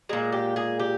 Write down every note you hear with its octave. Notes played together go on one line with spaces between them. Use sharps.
A#2 G#3 G#4
G4
G#4
G4